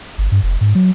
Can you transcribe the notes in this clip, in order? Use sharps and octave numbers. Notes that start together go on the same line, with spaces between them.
G1
G2
F1
G#2
F#3